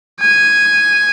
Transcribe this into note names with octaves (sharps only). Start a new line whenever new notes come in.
G#5